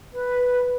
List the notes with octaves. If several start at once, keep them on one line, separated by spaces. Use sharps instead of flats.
B4